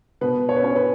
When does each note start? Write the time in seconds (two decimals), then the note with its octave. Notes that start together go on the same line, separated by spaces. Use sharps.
0.21 B2 B4
0.49 C#5
0.56 B4
0.62 C#4 C#5
0.76 B4